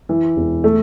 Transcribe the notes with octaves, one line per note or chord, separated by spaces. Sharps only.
E3
E1
A3